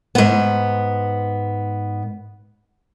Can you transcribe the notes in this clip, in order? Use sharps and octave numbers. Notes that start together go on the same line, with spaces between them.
G#2 B3